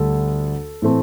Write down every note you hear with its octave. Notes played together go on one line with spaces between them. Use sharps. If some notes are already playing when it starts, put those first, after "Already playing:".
Already playing: D2 D3 G3 A4
A2 E3 A3 C4